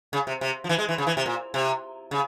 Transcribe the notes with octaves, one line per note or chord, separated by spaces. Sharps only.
C#3
C3
C3
F3
E3
G#3
E3
C#3
E3
C3
A#2
C3
C#3